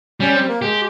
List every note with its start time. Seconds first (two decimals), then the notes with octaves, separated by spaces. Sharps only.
0.20 G3 C#4
0.34 C4
0.48 A#3
0.62 G#3 G4